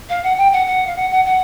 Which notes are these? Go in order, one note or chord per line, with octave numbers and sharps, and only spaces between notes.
F5
F#5
G5
F#5
F#5
F5
F#5
F#5
F#5